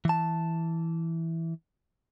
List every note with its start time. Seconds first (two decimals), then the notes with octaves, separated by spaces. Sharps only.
0.05 E3 A5